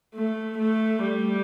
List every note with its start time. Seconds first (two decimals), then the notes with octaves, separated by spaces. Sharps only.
0.15 A3
0.58 A3
1.03 G3